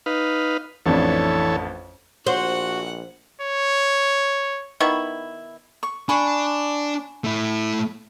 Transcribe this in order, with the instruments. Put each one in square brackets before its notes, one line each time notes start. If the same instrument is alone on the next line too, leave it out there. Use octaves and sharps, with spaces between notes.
[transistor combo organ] D#4 B4 F5
[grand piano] A1 F2 D4 [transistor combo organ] E3 A4 C#5
[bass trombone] A#1 [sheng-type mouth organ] F#4 [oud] C5 [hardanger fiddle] F#5
[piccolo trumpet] C#5
[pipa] D#3 B3 E4 C#6
[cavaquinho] C#6
[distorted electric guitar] D4 [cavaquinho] G#5 B5 C#6
[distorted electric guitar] A3 E4